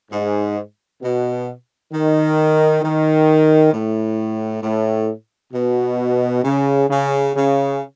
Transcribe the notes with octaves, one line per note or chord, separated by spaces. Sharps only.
G#2
B2
D#3
D#3
A2
A2
B2
C#3
C#3
C#3